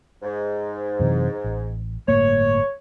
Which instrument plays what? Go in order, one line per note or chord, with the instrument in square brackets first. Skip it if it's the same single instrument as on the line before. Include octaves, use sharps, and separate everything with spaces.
[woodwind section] G#2
[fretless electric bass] F#2 C3 E3
A1
[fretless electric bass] G1 A2 A#3 [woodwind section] C#5